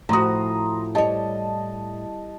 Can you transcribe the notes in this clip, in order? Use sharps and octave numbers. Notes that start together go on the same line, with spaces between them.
A2 F3 F#4 A#5 C6 D#6
G3 C#5 D#5 A5